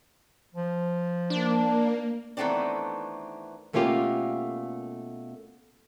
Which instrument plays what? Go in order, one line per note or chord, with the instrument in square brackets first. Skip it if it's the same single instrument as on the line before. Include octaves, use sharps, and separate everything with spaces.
[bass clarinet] F3
[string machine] A#3 [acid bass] D4
[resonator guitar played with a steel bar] D#3 E3 A3 B3 C4 D4
[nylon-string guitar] B2 A3 A#3 C#4 F4 G4